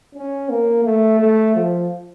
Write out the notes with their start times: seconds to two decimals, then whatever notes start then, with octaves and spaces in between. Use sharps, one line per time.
0.15 C#4
0.49 A#3
0.84 A3
1.20 A3
1.55 F3